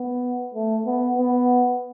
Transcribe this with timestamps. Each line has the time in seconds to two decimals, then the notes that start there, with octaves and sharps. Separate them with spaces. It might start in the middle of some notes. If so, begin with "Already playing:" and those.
Already playing: B3
0.54 A3
0.86 B3
1.18 B3